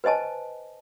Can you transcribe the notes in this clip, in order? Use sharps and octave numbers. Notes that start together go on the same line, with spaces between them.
B4 C5 D#5 G#5 A5